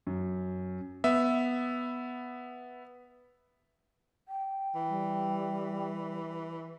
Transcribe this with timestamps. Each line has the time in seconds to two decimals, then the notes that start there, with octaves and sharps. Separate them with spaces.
0.07 F#2
1.04 B3 E5
4.28 G5
4.75 E3
4.89 G3